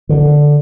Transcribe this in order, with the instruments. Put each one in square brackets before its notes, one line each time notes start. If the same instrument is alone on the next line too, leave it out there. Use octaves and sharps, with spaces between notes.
[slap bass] D3